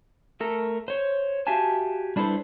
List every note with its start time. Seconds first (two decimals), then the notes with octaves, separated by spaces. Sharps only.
0.40 A3 A4 A#4
0.88 C5 C#5
1.47 F#4 G4 E5 F5 G#5 A5
2.16 G3 D4 E4 A4 B4 C5